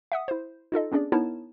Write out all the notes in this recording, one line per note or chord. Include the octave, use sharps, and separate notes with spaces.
E5 F#5 D#6
E4 C5
D#4 F4 A4 D#5
B3 C#4 D4 G#4 D5
B3 D#4 E4 A#4 C#5 A5